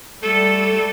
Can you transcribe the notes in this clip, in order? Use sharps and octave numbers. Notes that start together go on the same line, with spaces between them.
G3 A3 A4